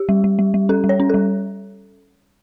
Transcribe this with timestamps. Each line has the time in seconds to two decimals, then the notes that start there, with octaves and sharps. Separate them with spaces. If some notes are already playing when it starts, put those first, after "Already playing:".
Already playing: G4
0.09 G3
0.24 G3
0.39 G3
0.54 G3
0.69 C#4 A4
0.84 G3
0.89 C#5
1.00 C#4
1.10 G3 A4